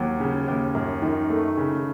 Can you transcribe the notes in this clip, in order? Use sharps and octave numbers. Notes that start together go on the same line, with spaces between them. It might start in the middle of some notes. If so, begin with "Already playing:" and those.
Already playing: D#2 F#3
C#3
D#2
F#2
D#3
A3
C#3